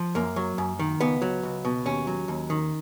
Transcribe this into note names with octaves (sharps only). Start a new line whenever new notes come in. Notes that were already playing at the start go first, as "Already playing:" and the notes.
Already playing: F3
F#2 A#3
F#3
F#2
D#3
C#2 B3
F#3
C#2
B2
D#2 C#4
F#3
D#2
D#3